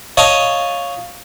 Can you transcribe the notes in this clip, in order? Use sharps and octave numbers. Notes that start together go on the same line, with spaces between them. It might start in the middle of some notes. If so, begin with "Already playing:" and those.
C#5 D#5 F5 A5